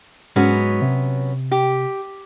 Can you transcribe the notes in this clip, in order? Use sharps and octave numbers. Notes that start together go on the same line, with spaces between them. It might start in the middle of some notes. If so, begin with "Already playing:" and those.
G#2 F#3 G#3 B3 C#4 F#4
C3
G4